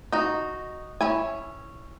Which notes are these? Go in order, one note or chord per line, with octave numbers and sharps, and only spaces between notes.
D#4 F#4
C#4 E4 G#5